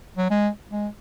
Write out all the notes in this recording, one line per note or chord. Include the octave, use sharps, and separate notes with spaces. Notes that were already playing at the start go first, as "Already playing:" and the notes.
F#3
G#3
G#3